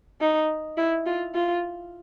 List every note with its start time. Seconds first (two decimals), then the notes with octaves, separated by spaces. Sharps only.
0.21 D#4
0.77 E4
1.06 F4
1.35 F4